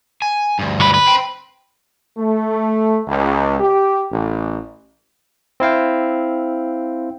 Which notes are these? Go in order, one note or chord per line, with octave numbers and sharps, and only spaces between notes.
G#5
D2 G2
F#3 B4
B4
C5 G5
A3
C#2
G4
A1
C4 E4 F5 G5